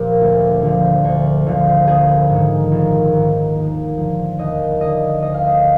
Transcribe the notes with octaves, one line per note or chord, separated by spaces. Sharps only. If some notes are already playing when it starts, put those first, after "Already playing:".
Already playing: A#2 F3 G4
D2
D3 F3
D2
D3 F3
A#1 G#4
G#2 D#3
A#1
G#2 D#3
D#2
D3 F3
D#2 D#5
D3 F3 D#5
D2 D#5
F5
D#5